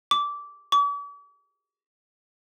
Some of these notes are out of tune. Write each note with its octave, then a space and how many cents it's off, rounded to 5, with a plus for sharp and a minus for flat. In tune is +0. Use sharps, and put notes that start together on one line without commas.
D6 -15
D6 -45